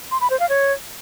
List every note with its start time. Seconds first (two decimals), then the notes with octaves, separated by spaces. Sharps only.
0.11 C6
0.21 B5
0.30 C5
0.40 F5
0.49 C#5